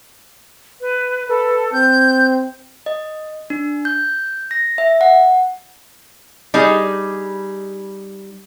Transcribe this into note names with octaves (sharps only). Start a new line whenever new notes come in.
B4
A4 B4
C4 G6
D#5
D4
G6
A#6
E5
F#5
G3 D#4 G#4